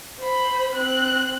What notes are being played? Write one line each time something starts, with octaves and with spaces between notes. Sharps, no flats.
C5 B5
C4 F#6